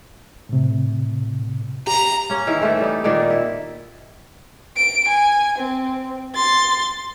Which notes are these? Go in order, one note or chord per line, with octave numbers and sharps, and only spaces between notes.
A2 C3
G4 A#5
A#3 C#4
D#3 E3 E4 A#4
E3 A3 C4 A4
G3 D#4
A#2 D#3 A#3 D5
E4
D7
G#5
C4
C6 A6